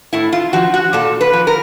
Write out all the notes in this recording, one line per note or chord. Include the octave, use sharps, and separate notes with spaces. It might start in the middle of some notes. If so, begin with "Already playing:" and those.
A2 E4
F4
F3 F#4
F#4
A#2 A4
B4
F3
A#4